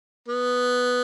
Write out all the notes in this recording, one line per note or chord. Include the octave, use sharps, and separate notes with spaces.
B3